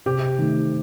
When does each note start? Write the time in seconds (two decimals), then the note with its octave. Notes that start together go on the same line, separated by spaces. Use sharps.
0.06 C3 G4
0.39 D#3 A3